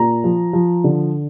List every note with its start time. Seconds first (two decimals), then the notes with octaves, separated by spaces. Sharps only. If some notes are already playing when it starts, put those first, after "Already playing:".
Already playing: A#2 A#5
0.24 F3
0.53 F3
0.84 D3